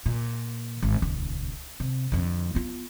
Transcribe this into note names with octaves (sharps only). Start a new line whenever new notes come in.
A#2
G#1
D#1 C#2
C3
F2 D3
B3 F4